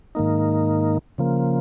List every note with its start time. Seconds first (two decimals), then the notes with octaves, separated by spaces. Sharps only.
0.15 G#2 D#3 A#3 D#4
1.18 C#3 F3 A#3